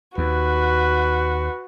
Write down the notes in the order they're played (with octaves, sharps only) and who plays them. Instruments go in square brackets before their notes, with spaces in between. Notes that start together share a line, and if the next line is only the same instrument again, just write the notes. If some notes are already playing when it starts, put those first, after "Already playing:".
[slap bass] D#2 [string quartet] F#4 [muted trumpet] B4